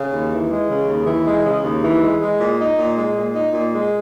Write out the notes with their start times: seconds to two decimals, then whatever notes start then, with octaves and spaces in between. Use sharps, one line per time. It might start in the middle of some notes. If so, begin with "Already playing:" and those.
Already playing: C#3
0.11 D#2
0.31 E3
0.50 G#3
0.68 C#3
0.87 D#2
1.07 E3
1.26 G#3
1.44 C#3
1.63 D#2
1.82 E3
2.02 G#3
2.20 G#3
2.39 A#2
2.58 D#4
2.78 A#2
2.96 G#3
3.16 A#2
3.34 D#4
3.53 A#2
3.72 G#3